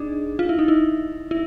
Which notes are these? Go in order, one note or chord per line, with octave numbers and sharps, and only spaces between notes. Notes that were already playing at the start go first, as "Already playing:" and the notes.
Already playing: D4 D#4 G#4
F4
E4
D#4
E4
E4